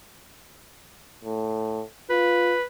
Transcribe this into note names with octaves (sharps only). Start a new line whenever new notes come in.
A2
F4 B4